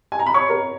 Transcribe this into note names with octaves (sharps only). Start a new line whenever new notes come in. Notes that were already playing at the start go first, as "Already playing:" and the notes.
G#5
A#5
B5
C#5 C#6
A#4 A#5